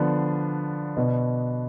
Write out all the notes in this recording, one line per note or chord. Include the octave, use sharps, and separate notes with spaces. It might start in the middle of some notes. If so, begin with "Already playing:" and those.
Already playing: D3 F3 B3 D4
B2 B3 D4